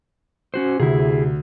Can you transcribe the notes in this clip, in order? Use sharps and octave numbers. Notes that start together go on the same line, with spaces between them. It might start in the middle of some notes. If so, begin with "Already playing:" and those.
C#4 F#4 C5
D2 C3 E4 G#4